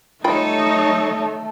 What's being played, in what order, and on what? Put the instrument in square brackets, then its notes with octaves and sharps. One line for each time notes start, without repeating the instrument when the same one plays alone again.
[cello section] G3 A4 C#5 [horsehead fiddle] A3 [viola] D#4 [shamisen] F4 G5 B5